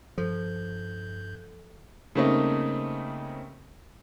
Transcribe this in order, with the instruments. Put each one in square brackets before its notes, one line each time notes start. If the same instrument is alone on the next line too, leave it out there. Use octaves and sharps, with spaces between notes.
[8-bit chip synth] G2 G6 [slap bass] F3 [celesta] A4
[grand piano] C#3 G3 A3 A#3 C4 D#4